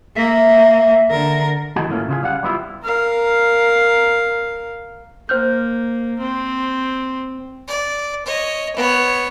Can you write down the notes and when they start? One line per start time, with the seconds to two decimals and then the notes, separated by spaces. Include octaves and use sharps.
0.16 A#3 E5
1.10 D3 A#4
1.76 D#3 E3 G#3 D#4 F#4 G#4
1.88 G#2 E3 A3 A#3 C#4 F4
2.09 C#3 F4 G#4
2.23 G3 F5 F#5
2.43 G3 B3 E4 F4
2.84 A#4 F5
5.29 A#3 C5 F6 G6
6.19 C4
7.68 D5
8.25 C#5 D#5
8.76 B3 C#5